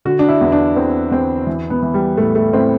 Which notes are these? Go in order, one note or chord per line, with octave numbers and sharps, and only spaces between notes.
D3 F#4
D4
E4
E2
D4
E2 C4
E2 C4
E3
B3
E3
G3
A2 A3
A3
A2 C4